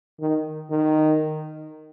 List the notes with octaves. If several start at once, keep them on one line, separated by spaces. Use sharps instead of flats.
D#3
D#3